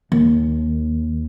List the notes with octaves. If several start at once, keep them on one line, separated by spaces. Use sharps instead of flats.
D#2